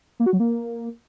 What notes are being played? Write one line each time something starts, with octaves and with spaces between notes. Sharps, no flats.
A#3
F#4
F#3
A#3